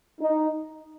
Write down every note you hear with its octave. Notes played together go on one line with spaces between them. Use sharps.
D#4